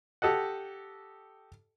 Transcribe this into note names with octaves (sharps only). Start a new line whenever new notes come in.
G4 A4 D#5 F#5